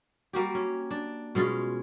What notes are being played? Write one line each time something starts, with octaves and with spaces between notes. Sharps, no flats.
G3 A#3 F#4 G4
C#4
D4
B2 G#3 C#4 F4